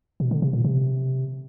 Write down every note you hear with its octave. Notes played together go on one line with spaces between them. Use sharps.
B2
D3
C3
A#2
C3